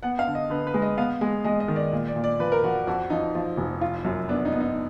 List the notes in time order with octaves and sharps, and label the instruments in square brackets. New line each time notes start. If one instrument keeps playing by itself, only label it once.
[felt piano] B3 [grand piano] F#5
[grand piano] F5
[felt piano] D3
[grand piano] D#5
[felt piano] D3 [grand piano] B4
[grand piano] B4
[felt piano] G#3
[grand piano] D#5
[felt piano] B3 [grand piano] F5
[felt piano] G#3
[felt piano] G#3 [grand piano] D#5
[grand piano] D#5
[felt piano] D#3
[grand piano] D5
[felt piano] A#2
[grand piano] D5
[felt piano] A#2
[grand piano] D5
[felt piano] F3 [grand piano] B4
[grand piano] A#4
[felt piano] F3 [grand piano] F#4
[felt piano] F2 [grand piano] F#4
[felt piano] F3 [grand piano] D#4
[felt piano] F3
F1
F4
F#2
[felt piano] B3 [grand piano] D4
[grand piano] D#4
[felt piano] B3
[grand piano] D#4